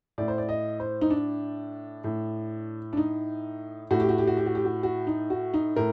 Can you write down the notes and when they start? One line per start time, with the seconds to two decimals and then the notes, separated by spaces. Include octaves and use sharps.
0.18 A2 D5
0.28 C5
0.38 D5
0.49 D#5
0.80 C5
1.01 D#4
1.10 D4
2.04 A2
2.93 D4
2.97 D#4
3.91 A2 F#4
4.00 G4
4.09 F#4
4.18 G4
4.27 F#4
4.37 G4
4.46 F#4
4.55 G4
4.65 F#4
4.83 F#4
5.07 D#4
5.30 F#4
5.54 D#4
5.76 A2 A#4